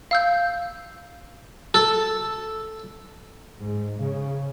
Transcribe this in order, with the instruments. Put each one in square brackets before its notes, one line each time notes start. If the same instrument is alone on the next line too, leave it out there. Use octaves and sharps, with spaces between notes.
[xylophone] F5 E6 G6
[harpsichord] A4
[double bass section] G#2
C#3